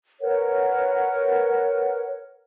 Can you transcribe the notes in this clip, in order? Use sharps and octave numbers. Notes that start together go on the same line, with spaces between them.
A#4 B4 C#5 F#5